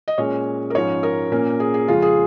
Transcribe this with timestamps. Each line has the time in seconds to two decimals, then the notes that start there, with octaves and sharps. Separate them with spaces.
0.08 D#5
0.18 A#2 G#3 C#4 C#5
0.70 A#4
0.75 G#2 F3 C#4 C#5
1.03 A#4
1.32 A#2 A#3 C#4
1.60 G#4
1.74 G#4
1.88 F2 C#3 G#3 F4
2.02 G#4